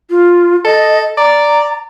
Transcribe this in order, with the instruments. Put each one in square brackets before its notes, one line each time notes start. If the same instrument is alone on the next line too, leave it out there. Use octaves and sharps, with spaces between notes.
[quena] F4
[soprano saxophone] A4 [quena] D#5
[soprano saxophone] D5 [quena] A#5